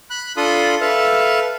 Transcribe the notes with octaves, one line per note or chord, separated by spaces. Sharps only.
B5 F#6
D4 F4 A4 B5 C6 D#6
A4 B4 E5 F5